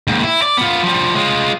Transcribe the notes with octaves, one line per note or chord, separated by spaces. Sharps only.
D#2 G#2
E4
D5
B3 F4
F3 G3
G#3 F4